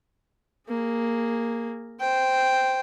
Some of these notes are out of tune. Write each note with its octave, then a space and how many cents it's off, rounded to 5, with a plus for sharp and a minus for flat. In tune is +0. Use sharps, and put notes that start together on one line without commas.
A#3 -5 G#4 -15
C5 -10 G5 +0